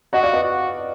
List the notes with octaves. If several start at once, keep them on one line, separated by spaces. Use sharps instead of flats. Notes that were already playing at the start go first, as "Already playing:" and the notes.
F#4 D#5 F#5
D5 F5
B4 D#5
F#4